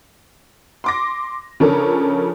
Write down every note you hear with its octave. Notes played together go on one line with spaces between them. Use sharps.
C6 D6 A#6
C#3 F3 C#4 D4 A4 A#4